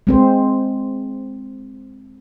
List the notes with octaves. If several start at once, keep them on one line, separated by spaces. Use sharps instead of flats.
G#3 C4 C5